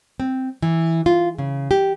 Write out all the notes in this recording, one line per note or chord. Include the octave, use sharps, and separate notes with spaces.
C4
E3
F4
C#3
G4